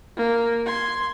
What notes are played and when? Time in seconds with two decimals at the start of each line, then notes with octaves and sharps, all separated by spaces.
0.17 A#3
0.66 C6 G#6